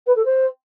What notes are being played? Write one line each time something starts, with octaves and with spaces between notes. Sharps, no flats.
B4
A4
C5